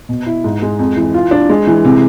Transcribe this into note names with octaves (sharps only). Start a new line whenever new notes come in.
B2
E4
G#2
G#3
F2
E3
F4
D4
G#3
E3
C3